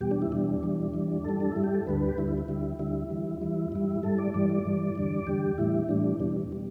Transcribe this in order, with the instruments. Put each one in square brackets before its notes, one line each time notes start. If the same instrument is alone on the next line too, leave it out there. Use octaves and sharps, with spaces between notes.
[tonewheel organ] E2 B2 G3 G4
D4
E4
E2 B2 G3 D4
E2 E3 G3
E2 E3 G3
G2 G3 A4
D4
G2 G3 E4
G4
A4
D2 D3 G3 B4
G4
D2 D3 G3 E4
E4
E4
D2 D3 G3 E4
D2 D3 G3 E4
E2 E3 G3
E2 E3 G3 E4
G2 G3 E4
G2 G3 A4
D5
G2 E3 G3 D5
D5
G2 E3 G3
E2 D3 G3
E2 D3 G3 G4
A2 E3 G3 E4
A2 E3 G3 D4
E2 B2 G3 D4
B2 G3